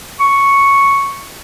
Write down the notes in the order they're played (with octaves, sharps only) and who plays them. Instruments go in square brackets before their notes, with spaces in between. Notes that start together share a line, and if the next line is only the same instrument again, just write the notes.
[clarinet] C#6